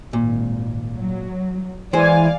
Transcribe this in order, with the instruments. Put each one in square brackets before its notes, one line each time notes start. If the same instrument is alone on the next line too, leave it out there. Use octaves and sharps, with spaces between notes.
[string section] G#1 [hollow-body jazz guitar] A#2
[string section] F#3
[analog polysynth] E3 G#5 [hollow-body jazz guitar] G#3 C5 [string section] D5 F5